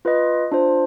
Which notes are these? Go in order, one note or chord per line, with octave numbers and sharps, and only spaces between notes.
F4 B4 D#5
D4 F4 C5